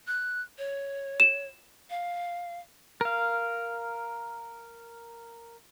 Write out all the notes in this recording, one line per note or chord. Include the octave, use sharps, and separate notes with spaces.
F#6
C#5
E7
F5
A#4 F5